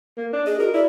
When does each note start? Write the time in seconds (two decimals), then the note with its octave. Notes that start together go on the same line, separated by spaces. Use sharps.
0.18 A#3
0.33 D4
0.46 G#4 D#5
0.60 F#4 A#4
0.74 E4 D5